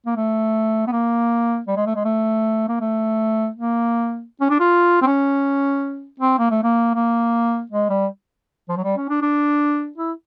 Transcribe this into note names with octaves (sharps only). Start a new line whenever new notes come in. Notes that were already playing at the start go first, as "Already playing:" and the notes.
A#3
A3
B3
A#3
G3
G#3
A3
G#3
A3
A#3
A3
A#3
C#4
D4
F4
C4
C#4
C4
A#3
A3
A#3
A#3
G#3
G3
F3
F#3
G3
C#4
D4
D4
E4